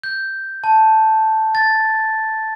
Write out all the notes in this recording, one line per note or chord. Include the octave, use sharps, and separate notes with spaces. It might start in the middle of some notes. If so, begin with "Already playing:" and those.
G6
A5
A6